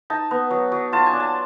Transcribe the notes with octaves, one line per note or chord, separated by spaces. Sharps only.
D#4 A5
B3
F#3
F#3
F4 A5
G#5
D4
A5